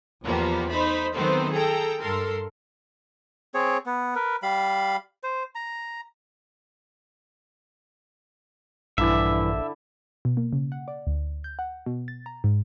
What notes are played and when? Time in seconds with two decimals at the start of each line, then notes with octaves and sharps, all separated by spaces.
0.24 E2 F3 G3 A#3 B3
0.69 A3 D#4 C5 B5
1.15 D#3 F#3 A3 B3 C4 C5
1.53 G#4 A4 G5 A#5
2.01 G2 A4 A#4 C6
3.54 C4 G#4 C#5
3.86 B3
4.15 A#4 B4
4.43 G3 F5 B5
5.23 C5
5.55 A#5
8.98 A#1 G2 D3 E3 E4 D5 E5
10.25 B2
10.37 A#3
10.53 C#3
10.72 F#5
10.88 D5
11.07 D2
11.44 G6
11.59 F#5
11.86 B2
12.08 A6
12.26 A#5
12.44 G#2